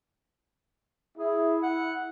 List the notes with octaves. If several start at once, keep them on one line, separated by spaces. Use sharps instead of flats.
E4 G#4
F#5